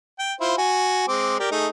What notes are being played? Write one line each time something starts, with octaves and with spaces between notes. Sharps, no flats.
G5
E4 F4 C5
F#4 G#5
G#3 C4 D6
G4 A#4 D5
A3 D#4 G#4